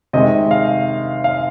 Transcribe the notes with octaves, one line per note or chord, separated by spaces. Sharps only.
C3 D#3 G#3 D#5
F5
F5